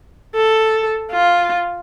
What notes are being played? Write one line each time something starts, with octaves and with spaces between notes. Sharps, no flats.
A4
F4